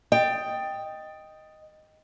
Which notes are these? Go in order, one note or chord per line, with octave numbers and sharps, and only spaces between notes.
D#5 G5